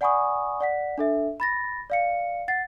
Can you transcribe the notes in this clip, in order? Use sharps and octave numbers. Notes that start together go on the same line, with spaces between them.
D5 F#5 G#5 B5 C#6 D#6
D5 F#5 B6
D4 A4 E5
B5 A6 A#6
D5 F5 C#7
F#5 A6 C7